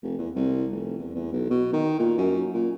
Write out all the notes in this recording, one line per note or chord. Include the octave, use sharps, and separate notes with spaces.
F1
E2
C2
F1
E2
E2
B1
B2
D#3
A#2
F#2
A#2